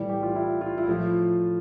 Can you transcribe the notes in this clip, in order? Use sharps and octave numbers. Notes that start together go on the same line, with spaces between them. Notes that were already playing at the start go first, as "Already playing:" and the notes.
Already playing: A2 E3 G3
G4
F4
E4
F4
E4
A2 F3 F4